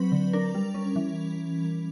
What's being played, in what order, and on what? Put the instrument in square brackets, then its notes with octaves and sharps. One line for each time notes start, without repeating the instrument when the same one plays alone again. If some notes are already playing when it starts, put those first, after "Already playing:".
Already playing: [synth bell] F#3 C4 B4
D3
D4 A#4
G3
C#4
E3